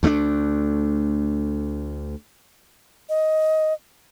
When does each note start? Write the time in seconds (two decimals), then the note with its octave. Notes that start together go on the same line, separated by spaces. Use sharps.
0.03 D2 A3 C#4 D4
3.09 D#5